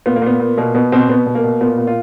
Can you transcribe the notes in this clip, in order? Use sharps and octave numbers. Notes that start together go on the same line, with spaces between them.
A#2 B3
A#3
A#2 B3
A#2
B2 A#3
B2 B3
B2 C4
B2 B3
B2
A#3
B2
A#2 B3
A#2
F4